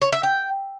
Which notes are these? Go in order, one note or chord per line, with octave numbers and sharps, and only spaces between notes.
C#5
E5
G5